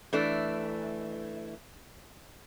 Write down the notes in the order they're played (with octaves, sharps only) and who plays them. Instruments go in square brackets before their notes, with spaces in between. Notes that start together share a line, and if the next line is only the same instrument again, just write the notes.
[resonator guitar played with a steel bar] E3 A3 D4